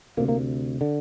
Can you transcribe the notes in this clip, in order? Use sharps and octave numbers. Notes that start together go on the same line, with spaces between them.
D2 C3 A#3
A#3
D3